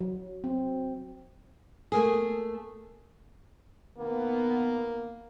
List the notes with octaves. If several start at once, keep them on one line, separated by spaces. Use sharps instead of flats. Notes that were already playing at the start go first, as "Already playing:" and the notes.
F#3
C4
A3 A#3 G#4
B2 D#3 A#3 B3